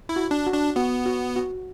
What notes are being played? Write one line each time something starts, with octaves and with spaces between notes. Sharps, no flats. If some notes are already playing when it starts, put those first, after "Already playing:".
E4
F#4
D4
F#4
D4
B3 F#4
F#4
F#4